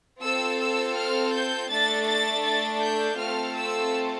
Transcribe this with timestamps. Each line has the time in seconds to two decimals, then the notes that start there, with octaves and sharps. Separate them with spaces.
0.21 C4 F4 A4 E6
0.58 E6
0.95 F6
1.32 G6
1.69 A3 D4 A4 A6
2.06 A6
2.43 A6
2.81 G6
3.17 A3 C4 F4 A4 F6
3.56 E6